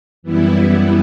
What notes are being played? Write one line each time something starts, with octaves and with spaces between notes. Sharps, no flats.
F#2 E3 G3 B3 E4